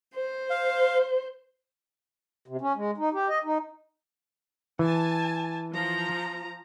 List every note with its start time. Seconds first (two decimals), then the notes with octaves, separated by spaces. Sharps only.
0.14 C5
0.50 F5
2.48 C3
2.61 C#4
2.76 G#3
2.97 D#4
3.14 G4
3.28 D#5
3.44 D#4
4.79 E3 G#5 A5
5.73 F3 A#5